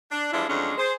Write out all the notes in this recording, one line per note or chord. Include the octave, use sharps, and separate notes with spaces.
D4
E3 F3 G3 G#3 D4 E4
F2 E3 F#3 G#3 C#4 D4
G#4 C5